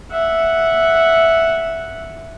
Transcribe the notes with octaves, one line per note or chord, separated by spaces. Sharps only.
E5 F#5